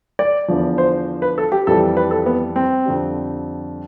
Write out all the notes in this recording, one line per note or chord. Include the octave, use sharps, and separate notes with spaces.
D5
E2 D3 F3
C5
B4
A4
G4
F2 E3 G3 A4
B4
A4
B3
C4
F2 D3 G3